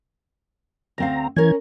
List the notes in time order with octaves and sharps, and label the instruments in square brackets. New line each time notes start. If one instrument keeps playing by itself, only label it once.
[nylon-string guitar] D2 C4 F5 [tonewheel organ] A#5
[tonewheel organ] E3 G#6 [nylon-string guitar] C#4 A#4